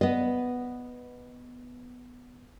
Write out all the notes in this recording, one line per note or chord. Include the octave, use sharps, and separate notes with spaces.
B3 D#5